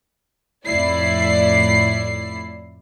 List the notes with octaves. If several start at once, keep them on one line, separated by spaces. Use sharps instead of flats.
F2 A2 E4 D5 C7